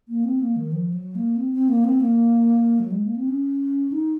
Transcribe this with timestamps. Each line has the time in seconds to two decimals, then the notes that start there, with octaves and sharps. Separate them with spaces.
0.08 A#3
0.25 C4
0.41 A#3
0.56 D#3
0.72 F3
0.94 F#3
1.15 A#3
1.36 C4
1.53 C4
1.68 A#3
1.84 C4
2.00 A#3
2.79 F#3
2.92 G#3
3.04 A#3
3.16 C4
3.28 C#4
3.92 D#4